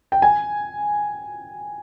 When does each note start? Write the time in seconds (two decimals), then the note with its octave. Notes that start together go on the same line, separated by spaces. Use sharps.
0.12 G5
0.22 G#5